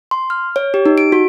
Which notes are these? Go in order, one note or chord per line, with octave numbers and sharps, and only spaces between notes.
C6
F6
C#5
G4
D#4
D7
F#4